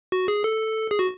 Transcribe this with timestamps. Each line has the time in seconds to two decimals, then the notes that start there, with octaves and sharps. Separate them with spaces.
0.12 F#4
0.28 G#4
0.44 A4
0.91 G#4
0.99 F#4